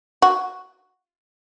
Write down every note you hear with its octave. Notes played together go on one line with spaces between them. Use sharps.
F#4